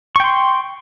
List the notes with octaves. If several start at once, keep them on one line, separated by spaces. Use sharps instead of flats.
G5 C6 C#6